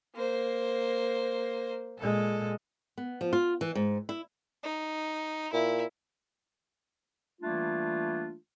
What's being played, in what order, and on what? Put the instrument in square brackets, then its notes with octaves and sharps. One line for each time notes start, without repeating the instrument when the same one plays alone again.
[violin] A#3 C5
[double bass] A#2 G#3 [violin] A4
[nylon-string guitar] B3
F3
F4
E3
G#2
E4
[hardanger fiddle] D#4
[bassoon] A#2 [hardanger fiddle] E4
[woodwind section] E3 G3 A3 A#3 D4 F4